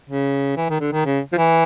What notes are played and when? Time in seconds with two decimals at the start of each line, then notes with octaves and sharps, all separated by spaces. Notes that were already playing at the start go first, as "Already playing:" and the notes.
0.09 C#3
0.57 E3
0.70 D#3
0.80 D3
0.93 D#3
1.05 C#3
1.33 F3
1.38 E3